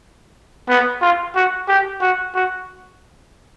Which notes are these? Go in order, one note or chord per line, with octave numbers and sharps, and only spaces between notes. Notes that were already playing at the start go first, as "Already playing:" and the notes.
B3
F4
F#4
G4
F#4
F#4